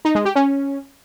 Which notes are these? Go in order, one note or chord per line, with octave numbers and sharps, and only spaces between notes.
D#4
G#3
G4
C#4